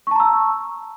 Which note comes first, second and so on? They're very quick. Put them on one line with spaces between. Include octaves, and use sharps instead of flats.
C#6 A5 A#5 E6